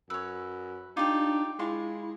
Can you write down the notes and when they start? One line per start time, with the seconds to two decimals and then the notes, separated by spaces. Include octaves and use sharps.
0.10 F#2 B4 C#5 E6
0.97 D4 D#4 F4 G4 D6
1.59 G#3 E4 F4 C6 C#6